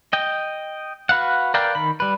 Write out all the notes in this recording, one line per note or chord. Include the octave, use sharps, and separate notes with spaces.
D#5 G5
F#4 B4 F5 F#5
A#4 B4 D5 F5 G5
D#3 B5
G3 B4